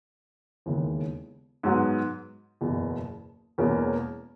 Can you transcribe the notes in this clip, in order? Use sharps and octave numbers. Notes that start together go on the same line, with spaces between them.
E1 D#2 C#3 E3
G#2 F#3 B3
F#1 E2 B2
E1 E2 B2 A#3 C#4